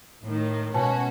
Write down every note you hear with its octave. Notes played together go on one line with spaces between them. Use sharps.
A2 D#3
B2 G#3 C#4 F#4 G#5 A5